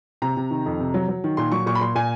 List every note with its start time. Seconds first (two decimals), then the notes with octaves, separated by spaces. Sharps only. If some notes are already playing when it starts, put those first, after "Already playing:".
0.22 C3 A#5
0.37 C3
0.51 D#3
0.66 F2
0.80 C3
0.94 F#3
1.08 F#3
1.24 D#3
1.37 A#2 C6
1.52 F#3 C#6
1.66 A#2 C#6
1.75 B5
1.81 A#2 C6
1.95 A#2 G#5